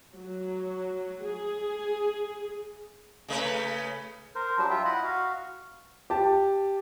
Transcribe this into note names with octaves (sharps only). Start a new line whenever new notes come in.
F#3
G#4
C#3 A3 B4
A#4 C5
F#3 G3 D4
F4 E5 G5
E4 D#5 F#5 B5
F#4 F5
G4 A5